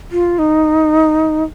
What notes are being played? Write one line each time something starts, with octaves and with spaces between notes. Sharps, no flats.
F4
D#4